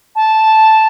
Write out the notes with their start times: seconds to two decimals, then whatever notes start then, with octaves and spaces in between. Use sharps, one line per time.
0.15 A5